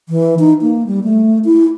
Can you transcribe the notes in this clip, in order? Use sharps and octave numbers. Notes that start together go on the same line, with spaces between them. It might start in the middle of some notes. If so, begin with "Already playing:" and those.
E3
D#4
A#3
G3
A3
E4